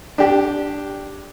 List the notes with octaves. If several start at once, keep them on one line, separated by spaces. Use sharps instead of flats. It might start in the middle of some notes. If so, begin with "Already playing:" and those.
D4 G4